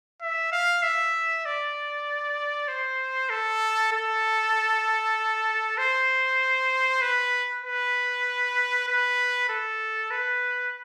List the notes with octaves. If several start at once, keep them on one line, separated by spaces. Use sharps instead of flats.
E5
F5
E5
D5
C5
A4
A4
C5
B4
B4
B4
A4
B4